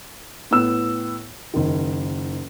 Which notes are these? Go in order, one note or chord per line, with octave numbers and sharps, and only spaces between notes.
A2 B3 E6 E7
F#1 D#3